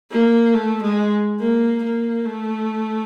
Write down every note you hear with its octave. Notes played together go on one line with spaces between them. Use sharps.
A#3
A3
G#3
A#3
A#3
A3